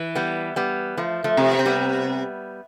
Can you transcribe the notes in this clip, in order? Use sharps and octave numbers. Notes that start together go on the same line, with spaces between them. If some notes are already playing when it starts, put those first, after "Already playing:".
Already playing: E3
G3 B3
G3 B3
F3 A3
F3 A3
C3
B3
C4
G3 B3